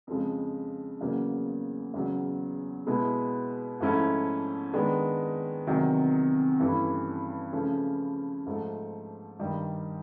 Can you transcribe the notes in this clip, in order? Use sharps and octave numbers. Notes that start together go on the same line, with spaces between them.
F2 C#3 F3 G#3
E2 C#3 F#3 A#3
E2 C#3 F#3
B2 G#3 B3 E4
G#2 F3 A3 C#4 E4
D#3 G#3 B3 D4
E2 C3 D#3 F#3
G2 E3 A3 C#4 E4
C#3 F3 A3 C#4
G#2 F3 A3
G2 D#3 G3